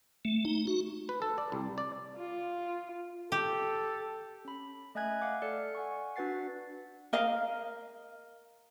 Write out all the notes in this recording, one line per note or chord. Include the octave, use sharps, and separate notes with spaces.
A3
D#4
F#4
B4
A4
D5
C2
D5
F4
G4 A4
C#4 B5
A3 D#5 E5 G#5 F#6 G#6
F5 F#5 D6
A4 D5 F6 C#7
F#5 G#5 C#6
D4 F#4 B4 F#5 A6 C7
A#4 D#5 F5